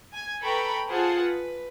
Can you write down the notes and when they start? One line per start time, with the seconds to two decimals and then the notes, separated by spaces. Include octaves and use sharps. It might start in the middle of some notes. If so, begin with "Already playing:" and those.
0.13 G#5 G#6
0.42 A4 B4 G5 A#5 B5 C#6
0.89 F4 G#4 C5 F#5 A5
1.22 B4